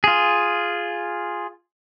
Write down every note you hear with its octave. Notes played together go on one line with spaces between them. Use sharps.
F4 G#4